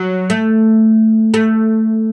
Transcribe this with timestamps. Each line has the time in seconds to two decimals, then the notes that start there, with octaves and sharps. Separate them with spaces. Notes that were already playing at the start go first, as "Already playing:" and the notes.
Already playing: F#3
0.30 A3
1.34 A3